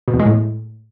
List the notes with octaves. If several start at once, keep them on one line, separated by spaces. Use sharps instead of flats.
B2
E2
G#3
A2